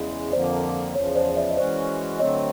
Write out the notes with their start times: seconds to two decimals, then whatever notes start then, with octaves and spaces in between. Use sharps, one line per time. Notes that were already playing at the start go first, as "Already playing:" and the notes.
Already playing: E2 C#3 E3 G#3
0.32 F2 D3 F3 A#3 C5 D5
0.95 E2 C#3 F3 C#5
1.15 C5 D5
1.36 D5 E5
1.50 D#5
1.57 E3 G#3 C#4 F#4 C5 D5
2.19 D3 F#3 A3 C4 C#5 D#5